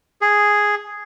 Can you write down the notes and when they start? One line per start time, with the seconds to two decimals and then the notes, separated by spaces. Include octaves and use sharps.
0.21 G#4